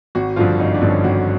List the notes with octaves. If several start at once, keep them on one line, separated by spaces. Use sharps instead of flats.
G#1 F#4
G2 D3 F3 F4
G#1 D#4
D4
G2 D3 F3
C#4
G#1 F#4